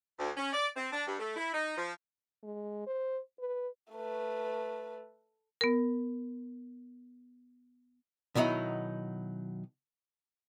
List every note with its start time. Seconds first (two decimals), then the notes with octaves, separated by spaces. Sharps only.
0.18 D2
0.37 C#4
0.53 D5
0.76 C4
0.92 D4
1.07 G2
1.19 A3
1.36 E4
1.53 D#4
1.77 F3
2.43 G#3
2.87 C5
3.39 B4
3.92 A3 B4
5.61 B3 A#4
8.35 B2 D#3 F#3 D#4 E4